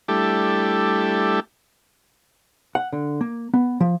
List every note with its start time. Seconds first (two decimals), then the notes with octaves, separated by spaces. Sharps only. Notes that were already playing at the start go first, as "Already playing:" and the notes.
0.08 G3 A3 D4 E4 G4 A4
2.75 F#5
2.93 D3
3.21 A#3
3.54 B3
3.80 F3